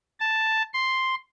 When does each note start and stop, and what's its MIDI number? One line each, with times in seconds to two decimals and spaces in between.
0.20 0.62 81
0.74 1.15 84